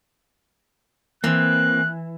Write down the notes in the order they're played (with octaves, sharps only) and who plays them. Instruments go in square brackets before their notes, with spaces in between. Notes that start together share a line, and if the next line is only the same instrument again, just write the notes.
[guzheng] E3 [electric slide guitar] A#3 C4 [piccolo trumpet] F#6